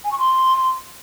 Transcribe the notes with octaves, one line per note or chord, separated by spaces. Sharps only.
G#5
C#6
C6